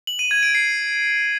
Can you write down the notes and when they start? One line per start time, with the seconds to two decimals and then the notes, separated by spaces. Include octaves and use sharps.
0.07 F#7
0.19 D#7
0.31 G#6
0.43 D7
0.55 C7